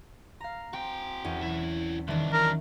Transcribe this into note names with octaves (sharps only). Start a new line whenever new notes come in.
F5 A#5
C4 F#4 G5
E2 C#4
B1 E4
C2 D#3 E3 D4
F#3 D4 A#4